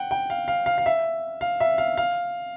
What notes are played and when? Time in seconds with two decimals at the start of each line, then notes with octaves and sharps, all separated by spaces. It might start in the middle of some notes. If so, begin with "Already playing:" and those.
Already playing: F#5 G5
0.11 G5
0.30 F5
0.48 F5
0.66 F5
0.78 F5
0.86 E5
1.41 F5
1.60 E5
1.78 F5
1.97 F5